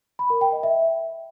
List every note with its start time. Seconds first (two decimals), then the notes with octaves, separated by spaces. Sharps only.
0.19 B5
0.30 A#4
0.41 G5
0.52 D#5
0.63 E5